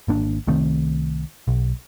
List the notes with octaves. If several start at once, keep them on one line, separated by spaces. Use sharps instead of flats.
G#1 A#3 D4
C2 D#3 A3 C4
B1